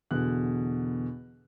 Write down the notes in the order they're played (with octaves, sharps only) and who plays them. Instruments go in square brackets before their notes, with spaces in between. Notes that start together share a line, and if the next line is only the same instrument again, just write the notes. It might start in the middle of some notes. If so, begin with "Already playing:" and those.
[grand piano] E2 B2 D3 F#6